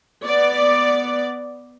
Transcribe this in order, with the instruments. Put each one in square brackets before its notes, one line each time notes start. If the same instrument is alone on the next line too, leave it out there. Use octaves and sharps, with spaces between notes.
[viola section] B3 D5